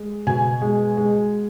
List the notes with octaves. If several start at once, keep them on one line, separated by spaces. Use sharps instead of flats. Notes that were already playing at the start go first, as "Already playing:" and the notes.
Already playing: G#3
B2 G#5
G#3
G#3